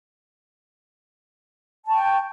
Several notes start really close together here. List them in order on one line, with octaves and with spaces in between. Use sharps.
A5 C#6 G5